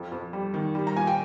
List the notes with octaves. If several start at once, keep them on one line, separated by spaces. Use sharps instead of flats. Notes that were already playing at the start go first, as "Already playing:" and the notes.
Already playing: F2 G5
F2
G3
D#3
G3
A#5
A#2 G#5
G5